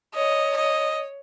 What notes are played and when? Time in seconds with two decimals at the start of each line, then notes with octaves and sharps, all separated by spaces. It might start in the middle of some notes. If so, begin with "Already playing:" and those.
0.15 C#5 D#5
0.57 D#5